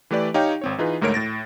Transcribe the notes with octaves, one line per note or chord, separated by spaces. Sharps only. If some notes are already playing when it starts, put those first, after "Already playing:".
E3 A3 G4 B4 D5
D#4 G4 C#5 F5 G5
G#1 C4 C#5
E3 D#4 F4 G#4 B4
D2 G#2 A3 A#4 C#5 D7
A2 A6 A#6